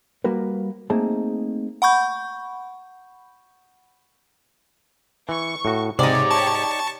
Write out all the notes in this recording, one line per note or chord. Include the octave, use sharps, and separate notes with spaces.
G3 A#3 F#4 A#4 B4
A3 A#3 C4 D#4 G#4 A5
F#5 B5 C#6 G6
E3 C#6
A2 F#4
G#2 C3 D#4 G4 C#5 D5
A5 C#6